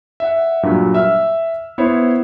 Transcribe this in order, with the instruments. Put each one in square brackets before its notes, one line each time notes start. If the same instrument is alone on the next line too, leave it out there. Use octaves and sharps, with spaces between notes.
[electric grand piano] E5 F#5
G2 A#2 F#3
E5 E6 F6
B3 E4 C5 C#5